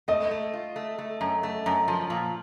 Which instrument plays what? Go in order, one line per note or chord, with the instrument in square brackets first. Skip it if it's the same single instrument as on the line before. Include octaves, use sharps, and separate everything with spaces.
[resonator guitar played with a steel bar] A3 [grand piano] D#5
[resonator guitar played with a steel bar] A3
F4
A3
A3
F#2
A3
F#2
F3
A#2